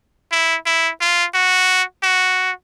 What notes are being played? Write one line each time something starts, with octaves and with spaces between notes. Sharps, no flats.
E4
E4
F4
F#4
F#4